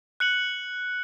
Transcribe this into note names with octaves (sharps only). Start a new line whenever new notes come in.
F#6 C#7 F#7